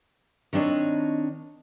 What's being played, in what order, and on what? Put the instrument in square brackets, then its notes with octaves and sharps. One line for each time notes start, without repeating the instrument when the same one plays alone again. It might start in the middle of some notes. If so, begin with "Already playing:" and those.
[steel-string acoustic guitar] D#3 C4 D4 C#5 D#5